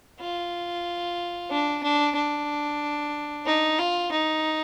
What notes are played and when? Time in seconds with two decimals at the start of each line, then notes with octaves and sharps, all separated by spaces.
0.20 F4
1.50 D4
1.83 D4
2.16 D4
3.46 D#4
3.79 F4
4.11 D#4